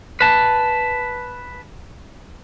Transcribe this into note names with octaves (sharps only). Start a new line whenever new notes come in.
B4 A5